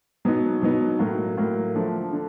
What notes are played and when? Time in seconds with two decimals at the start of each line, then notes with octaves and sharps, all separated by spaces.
0.25 B2 F#3 B3 D#4
0.62 B2 F#3 B3 D#4
0.99 A2 F#3 A#3
1.37 A2 F#3 A#3
1.75 D3 F3 A3
2.13 D3